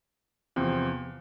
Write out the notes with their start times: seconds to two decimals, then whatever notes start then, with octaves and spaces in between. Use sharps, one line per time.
0.56 E2 C3 F3 C4